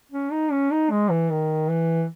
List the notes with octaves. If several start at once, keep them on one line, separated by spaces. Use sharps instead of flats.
C#4
D#4
C#4
D#4
G#3
E3
D#3
E3